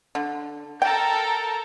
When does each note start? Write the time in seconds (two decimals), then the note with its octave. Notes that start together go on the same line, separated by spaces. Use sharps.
0.15 D3
0.82 A4 A#4 G5 A#5